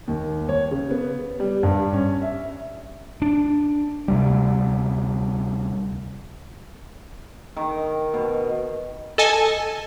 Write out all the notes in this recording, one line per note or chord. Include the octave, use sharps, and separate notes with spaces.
D#2
C#5
C#3
B3
G3
G2
C#4
E5
D4
D2 C3 G3
D#3
B2
A4 D#5 G#5 A5